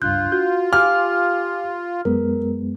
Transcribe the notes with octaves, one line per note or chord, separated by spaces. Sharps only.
C#2 G2 D4 F4 F#6 G6
F#4 G6
G4 F5 G#5 D6 F6
F#2 G#3 B3 A#4